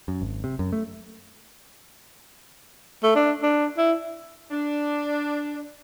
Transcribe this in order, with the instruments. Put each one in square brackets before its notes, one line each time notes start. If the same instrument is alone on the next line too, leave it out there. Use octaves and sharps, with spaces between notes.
[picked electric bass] F#2
G#1
C3
F#2
A3
[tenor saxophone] A3
D4
D4
E4
[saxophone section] D4